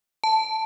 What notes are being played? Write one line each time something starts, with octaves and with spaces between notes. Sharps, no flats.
A5